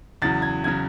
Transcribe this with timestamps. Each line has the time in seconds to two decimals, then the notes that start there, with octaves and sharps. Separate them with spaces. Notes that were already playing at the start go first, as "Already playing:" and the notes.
0.22 E2 C#3 F#3 A6
0.42 G#6
0.64 C#3 F#3 G#6